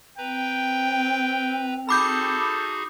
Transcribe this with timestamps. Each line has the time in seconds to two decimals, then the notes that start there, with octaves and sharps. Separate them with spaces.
0.18 C4 B4 G5 A#5
1.89 D#4 F#4 G#4 A4 B5 D6 G6